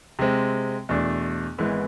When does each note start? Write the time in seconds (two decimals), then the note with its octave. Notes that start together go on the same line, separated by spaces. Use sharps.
0.19 C3 G#3 C4
0.89 E2 B2 A3 D4
1.58 G#1 G#2 E3 B3 E4